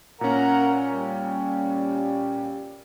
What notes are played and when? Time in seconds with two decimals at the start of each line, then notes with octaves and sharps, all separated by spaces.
0.21 A#2 C#4 A#4 F#5 A#5
0.90 G3